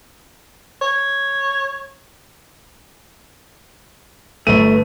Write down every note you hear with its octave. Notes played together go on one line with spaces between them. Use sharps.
C#5
G1 A3 B4 C#6 D#7